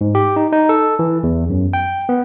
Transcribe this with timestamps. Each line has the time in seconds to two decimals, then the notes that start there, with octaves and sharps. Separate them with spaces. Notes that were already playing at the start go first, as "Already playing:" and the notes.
0.01 G#2
0.15 G4
0.36 D#4
0.53 D#4
0.69 A4
0.99 E3
1.23 E2
1.50 F#2
1.73 G5
2.09 B3